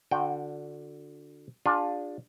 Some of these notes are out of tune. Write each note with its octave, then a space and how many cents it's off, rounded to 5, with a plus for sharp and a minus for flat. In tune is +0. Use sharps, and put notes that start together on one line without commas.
D3 +0 F#4 -35 G5 -5
D4 +0 F4 +20 G#4 -20